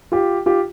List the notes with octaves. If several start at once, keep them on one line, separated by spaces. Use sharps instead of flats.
F4 G4
F4 G4